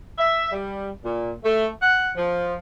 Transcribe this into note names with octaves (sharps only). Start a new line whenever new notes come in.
E5
G3
A#2
A3
F#5
F3